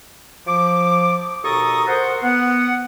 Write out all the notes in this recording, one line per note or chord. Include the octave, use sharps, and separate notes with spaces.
F3 D6
D#2 B2 A4 A#5 C#6 D#6
A#4 C5 F#5
B3 F#5